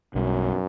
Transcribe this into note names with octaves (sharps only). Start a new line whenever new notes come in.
B1 F#2 B2 G3